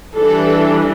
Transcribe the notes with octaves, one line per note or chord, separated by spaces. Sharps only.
E3 G3 D4 A4